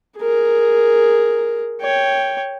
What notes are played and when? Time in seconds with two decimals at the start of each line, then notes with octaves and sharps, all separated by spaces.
0.19 G#4 A#4
1.81 C#5 G5